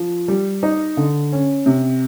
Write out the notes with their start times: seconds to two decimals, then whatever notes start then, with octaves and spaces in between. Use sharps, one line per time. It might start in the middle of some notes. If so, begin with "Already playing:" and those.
Already playing: F3
0.28 G3
0.63 D#4
0.97 D3
1.32 C#4
1.66 C3